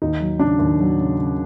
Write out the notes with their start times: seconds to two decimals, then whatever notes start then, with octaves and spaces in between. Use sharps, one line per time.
0.02 D#2 D#4
0.20 F#3
0.39 C#3 D4
0.59 D#2
0.79 F#3
0.98 C#3
1.18 C#3